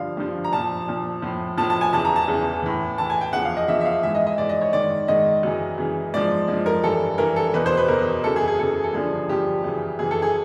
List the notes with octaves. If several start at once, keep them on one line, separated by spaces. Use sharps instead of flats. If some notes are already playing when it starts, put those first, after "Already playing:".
Already playing: G2 D3 F3 F5
G2 D3 F3
A#5
A#2 F3 A5
A#2 F3
A2 F3
A2 F3 A5
A5
G#5
E2 C#3 E3 A5
A#5
A5
E2 C#3 E3
A2 E3
A2 E3 A5
G#5
G5
E2 C#3 F3 F#5
F5
D#5
E2 C#3 F3 E5
E5
F5
G#2 E3 E5
D#5
D#5
G#2 E3 D5
D#5
C#5
G#2 D#3 D5
G#2 D#3 D#5
F#2 C#3 E3
F#2 C#3 E3
G#2 F3 D5
G#2 F3
A#4
G2 E3 A4
G2 E3 A#4
A4
E2 B2 B4
C5
B4
E2 B2 A#4
F#2 C#3 E3 A4
G#4
G#4
F#2 C#3 E3 A4
A4
G2 D3 F3 G#4
G2 D3 F3 G4
F#2 C#3 E3
F#2 C#3 E3 G#4
A4
G#4